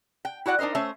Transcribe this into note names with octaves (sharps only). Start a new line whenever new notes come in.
G5
E4 F#4 D5 F#5
D4 D#4 A#4 C5 D#5
A3 C#4 C5 E5